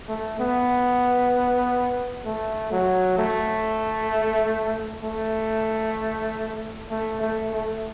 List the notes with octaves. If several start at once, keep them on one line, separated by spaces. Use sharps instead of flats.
A3
B3
A3
F#3
A3
A3
A3
A3
A3